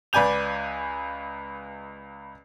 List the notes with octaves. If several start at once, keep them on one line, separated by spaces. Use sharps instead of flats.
C#2 B4 D5 G#5 G6 F7